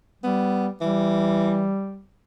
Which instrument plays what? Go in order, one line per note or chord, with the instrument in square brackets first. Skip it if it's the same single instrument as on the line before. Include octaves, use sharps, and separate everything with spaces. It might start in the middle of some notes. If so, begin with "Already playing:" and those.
[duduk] G3 [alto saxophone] B3
[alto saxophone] E3 [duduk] G3